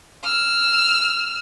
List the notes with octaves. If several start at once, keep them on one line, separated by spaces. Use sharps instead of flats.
E6 F6